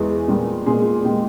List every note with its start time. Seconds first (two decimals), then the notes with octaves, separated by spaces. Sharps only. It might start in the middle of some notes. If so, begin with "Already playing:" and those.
Already playing: E2 E3 G#3 G#4
0.28 A#2 G3 A#3
0.66 A#2 G#3 G#4
1.04 A#2 G#3 G4